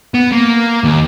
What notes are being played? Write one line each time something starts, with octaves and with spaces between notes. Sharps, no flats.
B3
A#3
D#2